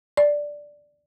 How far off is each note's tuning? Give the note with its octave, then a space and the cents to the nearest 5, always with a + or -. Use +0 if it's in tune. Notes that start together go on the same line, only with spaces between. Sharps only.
D5 +0